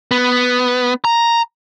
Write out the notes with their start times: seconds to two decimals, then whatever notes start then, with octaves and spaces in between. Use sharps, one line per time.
0.11 B3
1.05 A#5